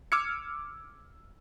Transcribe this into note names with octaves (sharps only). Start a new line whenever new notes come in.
D6 E6 F6 G#6 C#7